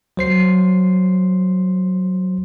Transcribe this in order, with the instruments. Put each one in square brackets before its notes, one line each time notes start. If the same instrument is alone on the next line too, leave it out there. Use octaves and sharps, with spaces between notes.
[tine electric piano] F#3 C5 C7